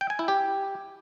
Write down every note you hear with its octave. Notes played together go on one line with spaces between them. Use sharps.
G5
G#5
E4
G4